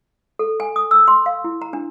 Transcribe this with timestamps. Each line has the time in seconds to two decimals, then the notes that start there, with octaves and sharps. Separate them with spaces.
0.39 A4
0.60 G#5
0.76 D#6
0.91 E6
1.08 C6
1.26 F5
1.44 E4
1.62 A#5
1.73 D4